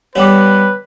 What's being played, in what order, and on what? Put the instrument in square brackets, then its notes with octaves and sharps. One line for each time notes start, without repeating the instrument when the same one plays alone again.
[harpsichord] G3 B3 [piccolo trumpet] B4 [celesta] C#5 G5 D6